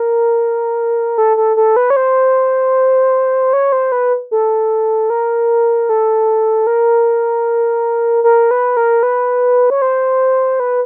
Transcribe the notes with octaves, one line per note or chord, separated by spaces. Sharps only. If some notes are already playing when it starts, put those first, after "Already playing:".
Already playing: A#4
A4
A4
A4
B4
C#5
C5
C#5
C5
B4
A4
A#4
A4
A#4
A#4
B4
A#4
B4
C#5
C5
B4